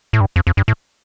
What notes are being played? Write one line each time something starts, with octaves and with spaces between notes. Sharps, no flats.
A2
G2
F2
F2
G2
A2